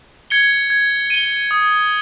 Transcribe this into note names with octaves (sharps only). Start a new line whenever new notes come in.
G#6 C#7 G7
G#6
D#7 G7
D#6